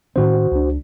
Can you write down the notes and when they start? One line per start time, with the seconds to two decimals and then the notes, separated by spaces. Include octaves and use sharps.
0.16 A2 D#3 C#4 F#4 C5
0.51 C#2 D4